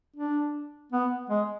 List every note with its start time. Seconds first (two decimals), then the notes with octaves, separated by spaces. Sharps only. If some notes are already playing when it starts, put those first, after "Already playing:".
0.16 D4
0.92 B3
1.30 G#3